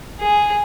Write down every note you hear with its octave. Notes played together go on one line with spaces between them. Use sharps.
G#4